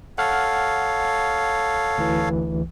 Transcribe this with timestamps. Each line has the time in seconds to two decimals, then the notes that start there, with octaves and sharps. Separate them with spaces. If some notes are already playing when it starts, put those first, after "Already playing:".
0.18 A4 C#5 F5 F#5 F6
1.98 D2 E3